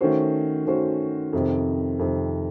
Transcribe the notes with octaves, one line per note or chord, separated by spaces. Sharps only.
D#3 A3 C#4 F#4 C5
D#3 A3 C#4 F#4 C5
F2 C3 D#3
F2 C3 D#3